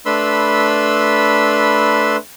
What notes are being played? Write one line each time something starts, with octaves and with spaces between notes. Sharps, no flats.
A3 D4 B4 B5 C6 E6